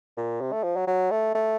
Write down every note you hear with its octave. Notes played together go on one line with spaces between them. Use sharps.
A#2
C3
A3
F3
F#3
F#3
A3
A3